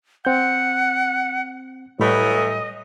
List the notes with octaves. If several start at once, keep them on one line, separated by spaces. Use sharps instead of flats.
C4 F#5 G6
A2 E3 F#3 G3 A3 D#5